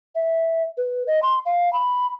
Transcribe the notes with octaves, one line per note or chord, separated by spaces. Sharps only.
E5
B4
D#5
C6
F5
B5